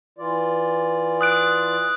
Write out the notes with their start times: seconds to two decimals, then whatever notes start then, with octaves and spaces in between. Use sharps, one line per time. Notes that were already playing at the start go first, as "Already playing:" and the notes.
0.18 E3 F4 D5
1.21 D#6 F#6 D7